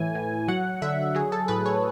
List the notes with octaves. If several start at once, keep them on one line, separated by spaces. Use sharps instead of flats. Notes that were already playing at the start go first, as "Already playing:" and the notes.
Already playing: A2 E3 G#5
A2
F#3 F#5
D3 E5
F#3 G#4
A4
A2 B4
C#5